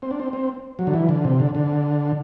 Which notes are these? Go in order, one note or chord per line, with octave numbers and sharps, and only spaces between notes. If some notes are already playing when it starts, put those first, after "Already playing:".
C4
D4
C4
C4
F#3
D3
E3
D3
C3
D3
D3